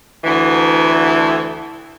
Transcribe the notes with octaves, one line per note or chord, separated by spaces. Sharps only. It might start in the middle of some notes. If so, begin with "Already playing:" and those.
D2 E3